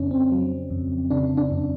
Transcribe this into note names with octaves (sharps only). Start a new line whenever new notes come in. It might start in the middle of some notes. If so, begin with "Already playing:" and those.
Already playing: F2 C#3 C#4 D4
C4
F#3
F2
C#3 D4
D4
F2